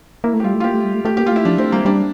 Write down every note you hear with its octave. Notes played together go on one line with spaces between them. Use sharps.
A#3 E4
A3
G4
G3 F4
A3
F4
A#3 G4
A3
G3
A3
A3 G4
A#3 G4
F4
A3 E4
F3 D4
A3 C4
G3 A#3
G3 D4